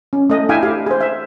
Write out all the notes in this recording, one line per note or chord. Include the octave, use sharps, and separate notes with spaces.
C#4
A3 D#5
D4 E4 E5 F5 G5 G#5
E4 G4 F5
G#4 C5
E5